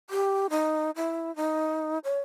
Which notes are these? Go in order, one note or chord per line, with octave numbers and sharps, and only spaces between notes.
G4
D#4
E4
D#4
C#5